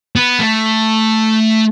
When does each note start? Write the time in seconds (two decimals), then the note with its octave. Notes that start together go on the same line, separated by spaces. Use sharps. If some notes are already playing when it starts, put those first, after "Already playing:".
0.16 B3
0.40 A3